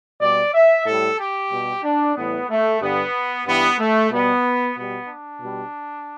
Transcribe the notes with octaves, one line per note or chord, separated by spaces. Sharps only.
B2 G3 D5
E5
A2 G3 A4
G4
B2 G3
D4
A2 E3 G3 B3
A3
G2 D3 G3 B3
G2 E3 G3 B3
A3
B2 G3 B3
B2 G3 B3
D4
B2 G3